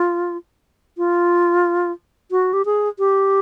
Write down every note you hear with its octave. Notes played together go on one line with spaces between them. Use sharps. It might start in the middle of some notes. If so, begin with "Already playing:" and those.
Already playing: F4
F4
F#4
G4
G#4
G4